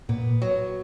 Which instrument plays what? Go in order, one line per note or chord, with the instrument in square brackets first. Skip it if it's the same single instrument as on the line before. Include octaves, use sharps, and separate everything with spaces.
[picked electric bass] A#2 [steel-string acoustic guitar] B3
[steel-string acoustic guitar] F#3